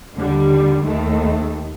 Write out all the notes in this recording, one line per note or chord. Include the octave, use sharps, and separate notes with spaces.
D#2 D3 G3
D#2 D#3 A3